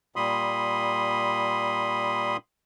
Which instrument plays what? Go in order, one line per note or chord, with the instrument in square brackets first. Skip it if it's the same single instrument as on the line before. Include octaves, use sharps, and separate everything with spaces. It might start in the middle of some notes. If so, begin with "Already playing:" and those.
[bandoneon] A#2 G3 B5 C6 D#6